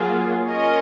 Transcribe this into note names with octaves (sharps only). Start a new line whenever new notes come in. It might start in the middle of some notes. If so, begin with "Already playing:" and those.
Already playing: F#3 A#3 F4 G#4
C#4 F4 A#4 D#5